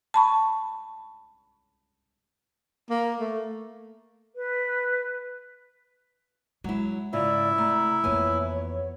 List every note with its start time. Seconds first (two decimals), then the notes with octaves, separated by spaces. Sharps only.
0.14 A5 B5 C#6
2.90 A#3
3.20 A3
4.35 B4
6.64 F#3 G#3 E4
7.13 G#2 C#3 E4 F4 D5
7.58 C3 A3 A#5
8.04 F2 E3 A#3 B3 C#5 G#5